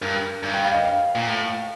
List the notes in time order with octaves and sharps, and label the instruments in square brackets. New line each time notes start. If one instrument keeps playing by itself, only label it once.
[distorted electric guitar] G2 [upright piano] A#4
[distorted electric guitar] G2
[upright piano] G5
F5
D#5
F5
[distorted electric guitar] A#2
A2